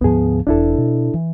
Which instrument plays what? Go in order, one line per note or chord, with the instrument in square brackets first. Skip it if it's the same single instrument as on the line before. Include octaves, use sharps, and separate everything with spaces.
[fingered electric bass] D2 G#2 F3 [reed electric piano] B3 G#4
[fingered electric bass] E1 A1 E2 [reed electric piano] D4 E4 A4
[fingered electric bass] B2
E3